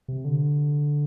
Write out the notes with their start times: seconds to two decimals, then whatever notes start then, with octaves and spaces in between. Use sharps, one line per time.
0.08 C3
0.25 D3